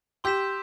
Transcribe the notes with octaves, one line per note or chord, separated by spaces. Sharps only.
G4 C6 E6 G6 B6 E7